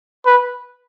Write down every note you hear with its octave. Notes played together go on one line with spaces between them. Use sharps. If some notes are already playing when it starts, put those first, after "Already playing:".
B4